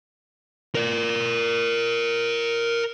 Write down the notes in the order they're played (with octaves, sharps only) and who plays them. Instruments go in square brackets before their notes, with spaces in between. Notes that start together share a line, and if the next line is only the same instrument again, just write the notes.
[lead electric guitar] A#4 D5